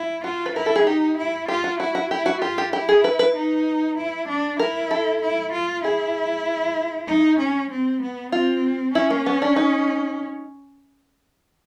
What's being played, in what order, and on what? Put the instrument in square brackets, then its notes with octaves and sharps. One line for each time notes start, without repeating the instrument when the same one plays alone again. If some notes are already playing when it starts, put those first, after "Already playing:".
Already playing: [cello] E4
[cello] F4 [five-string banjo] F#4
[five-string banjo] B4
[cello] E4 [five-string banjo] A#4
[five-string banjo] A4
G#4
[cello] D#4 [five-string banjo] G4
[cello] E4
[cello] F4 [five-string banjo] G4
[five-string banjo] F#4
[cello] E4 [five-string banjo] F#4
[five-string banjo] F#4
[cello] E4 [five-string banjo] G4
[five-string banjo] F#4
[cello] F4 [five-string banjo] G4
[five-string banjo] G4
[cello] E4 [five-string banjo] G4
[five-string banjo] G#4
B4
B4
[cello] D#4
E4
D4
[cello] E4 [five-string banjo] A#4
[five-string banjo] A4
[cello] E4
F4
[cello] E4 [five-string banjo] G#4
[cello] D#4
C#4
C4
B3
[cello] C4 [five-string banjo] F4
[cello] C#4 [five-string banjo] E4
[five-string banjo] A#3
B3
D4
D#4